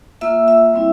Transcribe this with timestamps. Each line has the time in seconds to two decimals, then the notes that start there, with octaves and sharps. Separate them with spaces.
0.21 A#3 F4 E5 E6
0.48 E5 E6
0.74 G3 C4 E4